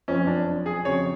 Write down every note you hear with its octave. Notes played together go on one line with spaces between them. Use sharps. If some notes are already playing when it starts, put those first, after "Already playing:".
F#1 F2 F3 C#4
D4
G#4
F2 C#3 F#3 C#5